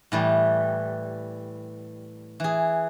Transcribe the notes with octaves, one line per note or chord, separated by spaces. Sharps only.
A2 E3 G3
E3 G#4